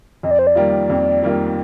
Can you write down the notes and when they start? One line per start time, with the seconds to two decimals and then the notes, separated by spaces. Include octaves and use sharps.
0.23 F2 D#5
0.31 D5
0.39 C5
0.47 D5
0.55 D#3 G3 A#3 F4
0.90 F2
1.23 D#3 G3 A#3 F4